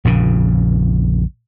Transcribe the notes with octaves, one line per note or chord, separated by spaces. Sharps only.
A#1 F2 C#3